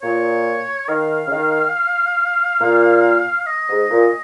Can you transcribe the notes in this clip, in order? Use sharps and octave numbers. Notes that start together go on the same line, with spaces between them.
A#2 C#5
D#3 F5
C#3
D#3
A#2
D#5
G#2
A#2